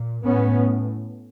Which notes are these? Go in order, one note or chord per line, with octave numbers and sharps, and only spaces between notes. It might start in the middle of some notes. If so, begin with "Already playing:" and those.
Already playing: A#2
A2 B3 C#4